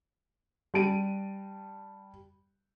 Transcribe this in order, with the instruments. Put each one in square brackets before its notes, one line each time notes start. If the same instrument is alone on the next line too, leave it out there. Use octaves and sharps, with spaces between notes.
[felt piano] G3 A5 D7 D#7